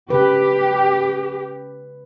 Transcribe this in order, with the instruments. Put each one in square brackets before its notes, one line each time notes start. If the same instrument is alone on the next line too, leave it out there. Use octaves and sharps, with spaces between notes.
[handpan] C#3 B4 [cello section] G4